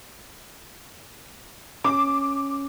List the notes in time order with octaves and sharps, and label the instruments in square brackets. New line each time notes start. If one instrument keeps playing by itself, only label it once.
[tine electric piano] C#4 [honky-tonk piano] D6